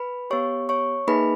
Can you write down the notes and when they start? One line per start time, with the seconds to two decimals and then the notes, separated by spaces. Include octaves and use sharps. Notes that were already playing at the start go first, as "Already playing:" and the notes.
Already playing: B4 B5
0.30 B3 G4 C#5 C#6
0.69 C#5 C#6
1.08 A#3 D#4 G#4 B4 B5